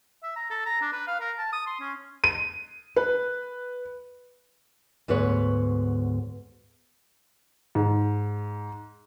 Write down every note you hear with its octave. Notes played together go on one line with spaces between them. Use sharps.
E5
A#5
A4
A#5
D4
B4
F5
A#4
A5
D#6
C6
C#4
D#7
B4
D2 G#2 B3 B4 C#5
G#2